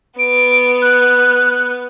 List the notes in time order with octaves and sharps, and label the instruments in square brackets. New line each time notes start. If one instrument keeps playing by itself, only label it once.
[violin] B3 [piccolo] D7
[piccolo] F#6